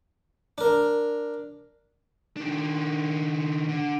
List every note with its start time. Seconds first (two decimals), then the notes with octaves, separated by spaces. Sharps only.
0.58 D4 A#4
2.37 D#3 D4
3.69 D3